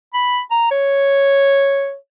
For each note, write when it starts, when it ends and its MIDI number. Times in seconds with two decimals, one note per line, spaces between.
0.14 0.40 83
0.51 0.67 82
0.71 1.96 73